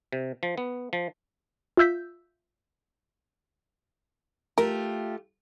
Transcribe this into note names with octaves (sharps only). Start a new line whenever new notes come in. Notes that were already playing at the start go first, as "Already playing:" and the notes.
C3
F3
B3
F3
F4 E5 E6 G6 B6
A3 F4 G4 A#4